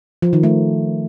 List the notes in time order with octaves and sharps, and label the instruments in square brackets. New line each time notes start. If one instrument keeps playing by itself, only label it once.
[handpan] F3
D#3
A3